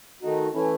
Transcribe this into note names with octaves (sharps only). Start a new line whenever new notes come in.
D#3 A3 D#4 F#4
E3 A3 C#4 E4